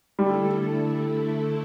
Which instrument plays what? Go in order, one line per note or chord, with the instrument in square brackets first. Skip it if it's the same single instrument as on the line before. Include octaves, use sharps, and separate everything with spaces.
[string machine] D3 A3 E4 A4 [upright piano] G3